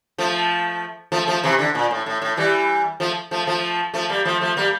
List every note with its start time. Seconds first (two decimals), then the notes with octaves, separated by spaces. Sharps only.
0.18 F3 A3
1.12 F3 A3
1.27 F3 A3
1.43 C3 E3
1.59 D3
1.75 A#2
1.91 A2
2.06 A2
2.22 A2
2.37 E3 G3
3.00 F3 A3
3.31 F3 A3
3.47 F3 A3
3.94 F3 A3
4.09 G3 A#3
4.25 F3 A3
4.42 F3 A3
4.57 G3 A#3